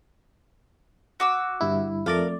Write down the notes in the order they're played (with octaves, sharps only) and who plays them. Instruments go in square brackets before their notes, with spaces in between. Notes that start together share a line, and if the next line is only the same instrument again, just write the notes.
[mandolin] F#4 D6 E6
[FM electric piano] G1 G2 E4
[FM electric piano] F2 A3 D5 [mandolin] A#4 F5